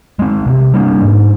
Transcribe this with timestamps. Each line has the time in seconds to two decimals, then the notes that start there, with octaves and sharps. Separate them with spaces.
0.19 G#3 C4
0.46 C3
0.74 G3 A#3 D4
1.01 G#2